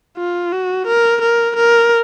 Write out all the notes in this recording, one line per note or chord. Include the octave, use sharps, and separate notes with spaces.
F4
F#4
A#4
A#4
A#4